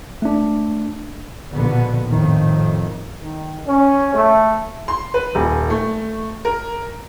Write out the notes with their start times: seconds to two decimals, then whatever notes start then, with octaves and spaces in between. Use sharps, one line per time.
0.22 A3 D4
1.52 A#1 B2 D3 B3
2.08 F2 A2 D#3
3.22 D#3
3.66 C#4
4.14 A3
4.88 C6
5.14 B4
5.35 D#1
5.70 A3
6.45 A#4